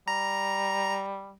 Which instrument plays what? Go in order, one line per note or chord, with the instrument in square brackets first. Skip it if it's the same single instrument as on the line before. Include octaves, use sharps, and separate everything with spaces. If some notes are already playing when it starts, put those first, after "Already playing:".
[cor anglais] G3 [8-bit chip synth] A#5